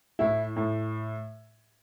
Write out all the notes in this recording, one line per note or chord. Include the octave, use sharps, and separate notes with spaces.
A2 E4
A2